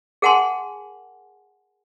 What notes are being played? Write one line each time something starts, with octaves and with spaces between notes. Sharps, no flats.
G#4 A#4 F#5 G#5 A5 C6